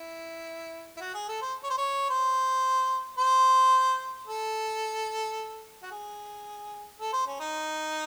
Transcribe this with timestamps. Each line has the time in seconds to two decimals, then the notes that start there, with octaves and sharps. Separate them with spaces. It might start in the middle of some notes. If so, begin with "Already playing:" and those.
Already playing: E4
0.97 E4
1.01 F#4
1.14 G#4
1.29 A4
1.42 C5
1.63 C#5
1.70 C5
1.78 C#5
2.10 C5
3.18 C5
4.27 A4
5.83 F#4
5.91 G#4
6.99 A4
7.13 C5
7.27 C#4
7.40 D#4